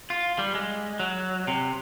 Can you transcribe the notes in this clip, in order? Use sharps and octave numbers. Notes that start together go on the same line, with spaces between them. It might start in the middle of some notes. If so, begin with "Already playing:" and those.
F4
G3
G#3
F#3
C3